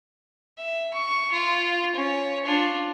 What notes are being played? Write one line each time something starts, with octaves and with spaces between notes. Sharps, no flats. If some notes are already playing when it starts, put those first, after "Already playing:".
E5
C#6
F4
C#4 C#5
D4 F4